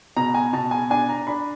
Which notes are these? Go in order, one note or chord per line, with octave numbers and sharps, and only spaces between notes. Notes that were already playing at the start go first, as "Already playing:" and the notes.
B2 A#5
G#5
B2 A5
G#5
D4 G#5
A#5
D4 B5